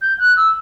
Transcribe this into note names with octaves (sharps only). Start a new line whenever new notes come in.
G6
F#6
E6